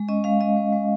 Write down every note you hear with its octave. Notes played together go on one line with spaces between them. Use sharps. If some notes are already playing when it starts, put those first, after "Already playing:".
Already playing: G#3
C#4 D#5
G#3 F5
G#3 D#5
G#3
G#3